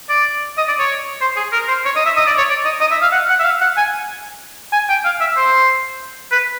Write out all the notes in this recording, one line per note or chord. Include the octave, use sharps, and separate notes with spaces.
D5
D#5
D5
C#5
C5
G#4
A#4
C5
C#5
D#5
E5
D#5
D5
C#5
D5
D#5
D#5
E5
F5
F#5
F#5
E5
F5
F#5
G#5
G#5
G5
F5
E5
C5
B4